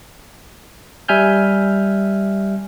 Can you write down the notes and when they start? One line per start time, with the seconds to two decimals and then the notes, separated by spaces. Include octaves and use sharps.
1.08 G3 E5 G#5 F6 G6